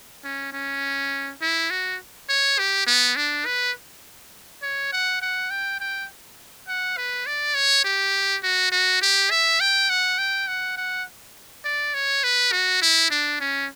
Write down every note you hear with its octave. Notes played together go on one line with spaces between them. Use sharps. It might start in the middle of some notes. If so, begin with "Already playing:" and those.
C#4
C#4
E4
F#4
C#5
G4
B3
D4
B4
C#5
F#5
F#5
G5
G5
F#5
B4
D5
C#5
G4
F#4
F#4
G4
E5
G5
F#5
G5
F#5
F#5
D5
C#5
B4
F#4
E4
D4
C#4